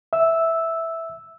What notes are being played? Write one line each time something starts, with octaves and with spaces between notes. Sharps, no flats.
E5 E6